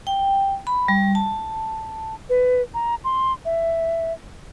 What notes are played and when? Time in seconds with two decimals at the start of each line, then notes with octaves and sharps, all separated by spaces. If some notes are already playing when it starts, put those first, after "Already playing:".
0.07 G5
0.67 B5
0.88 G3
1.15 A5
2.29 B4
2.74 A#5
3.04 C6
3.45 E5